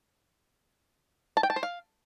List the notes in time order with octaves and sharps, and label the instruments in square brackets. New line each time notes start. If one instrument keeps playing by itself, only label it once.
[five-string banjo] A5
G5
A5
C5
F5